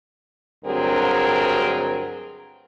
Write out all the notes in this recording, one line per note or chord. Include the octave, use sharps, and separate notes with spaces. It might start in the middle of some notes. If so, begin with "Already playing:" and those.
D2 G2 F#3 C4 G#4 A#4